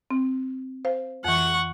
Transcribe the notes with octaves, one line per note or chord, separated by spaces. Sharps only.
C4
C5 F5
F2 E3 F#5 C#6